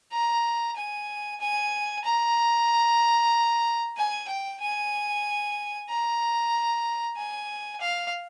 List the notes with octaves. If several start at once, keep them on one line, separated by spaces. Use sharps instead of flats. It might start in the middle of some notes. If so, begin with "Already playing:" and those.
A#5
G#5
G#5
A#5
G#5
G5
G#5
A#5
G#5
F5